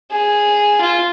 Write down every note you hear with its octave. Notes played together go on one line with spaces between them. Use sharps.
G#4
F4